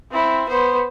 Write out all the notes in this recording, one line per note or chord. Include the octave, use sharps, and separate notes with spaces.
C4 E4
B3 C5